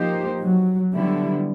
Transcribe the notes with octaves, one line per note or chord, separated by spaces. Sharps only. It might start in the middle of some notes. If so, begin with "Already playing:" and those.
Already playing: F3 A#3 D#4 G4 C5
F#3
D3 F#3 G3 B3 E4